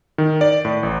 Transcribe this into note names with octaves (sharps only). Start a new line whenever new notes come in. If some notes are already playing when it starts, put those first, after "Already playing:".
D#3
D5
A2
A1